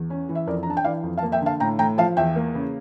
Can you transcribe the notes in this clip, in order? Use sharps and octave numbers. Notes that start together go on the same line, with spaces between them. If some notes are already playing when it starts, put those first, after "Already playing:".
Already playing: E2
C#4
E3
E5
F2 A#4 D5
A#5
D4 A5
G5
E3 D5 F5
F2
F5 A5
A#3
E5 G5
D3 F5 A5
A2 G5 A#5
A2 G5 A#5
F3 F5 A5
E2 E5 G5
A#3
C#3